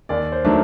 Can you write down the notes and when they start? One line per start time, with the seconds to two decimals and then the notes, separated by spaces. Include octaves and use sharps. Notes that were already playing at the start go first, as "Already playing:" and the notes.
0.09 D#2 D5
0.32 C5
0.45 D#3 F#3 A3 D4